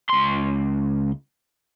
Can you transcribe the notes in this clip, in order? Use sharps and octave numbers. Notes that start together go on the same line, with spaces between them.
C#2 C6